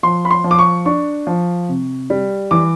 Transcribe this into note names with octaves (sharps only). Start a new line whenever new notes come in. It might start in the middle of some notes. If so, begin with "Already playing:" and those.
F3 C6
B5
C6
F3
D6
C#6
D4 C#6
F3
C3
G3
E3 D6